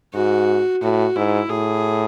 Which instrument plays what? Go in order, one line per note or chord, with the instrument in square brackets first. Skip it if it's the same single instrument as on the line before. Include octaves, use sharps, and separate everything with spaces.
[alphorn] G#2 [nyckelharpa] F#4
[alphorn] A2 [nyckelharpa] F#4
[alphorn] G#2 [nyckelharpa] E4
[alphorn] A2 [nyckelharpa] G#4